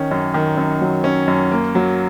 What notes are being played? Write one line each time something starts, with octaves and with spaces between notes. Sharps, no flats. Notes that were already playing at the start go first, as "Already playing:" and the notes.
Already playing: D#3 C#4
F#2
D#3
F#2
F#3
C#4
F#2
A#3
F#3